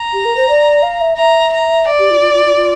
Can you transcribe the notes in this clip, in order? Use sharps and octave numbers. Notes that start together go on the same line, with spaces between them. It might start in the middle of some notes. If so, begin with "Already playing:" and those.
Already playing: A#5
G4
A#4
C5
D5
F5
E5
E5 A#5
A#5
D5
G4
F4
F4
F4
F4
F4